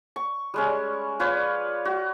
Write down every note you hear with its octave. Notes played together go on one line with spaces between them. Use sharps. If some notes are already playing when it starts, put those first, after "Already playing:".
C#6
G3 G#3 C#4
F4 B4 C#5 D5
F#4